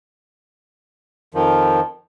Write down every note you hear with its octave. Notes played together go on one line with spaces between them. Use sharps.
F2 D#3 F3